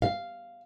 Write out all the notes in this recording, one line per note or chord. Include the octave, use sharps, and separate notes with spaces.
F5